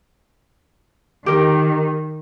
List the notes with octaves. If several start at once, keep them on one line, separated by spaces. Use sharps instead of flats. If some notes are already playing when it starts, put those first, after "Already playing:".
D#3 G4 A#4